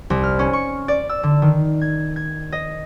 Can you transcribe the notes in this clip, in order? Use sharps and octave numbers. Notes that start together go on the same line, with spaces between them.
C2
F6
C#4
C#6
D5
E6
D3
D#3
G#6
G#6
D#5